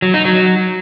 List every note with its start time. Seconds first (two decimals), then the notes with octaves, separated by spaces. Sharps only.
0.02 F#3
0.14 D#4
0.25 F#3